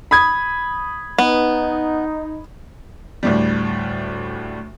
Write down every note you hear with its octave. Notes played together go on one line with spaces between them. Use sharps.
B5 D#6 G#6
B3 D#4
D2 A2 G3